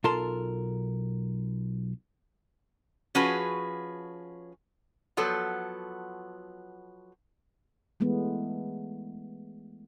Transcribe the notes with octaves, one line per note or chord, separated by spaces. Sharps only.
B1 F4 A4 A#4 A5 C6
F3 C#4 F#4 G#4 B4
F3 F#3 B3 A4
E3 G#3 A3 B3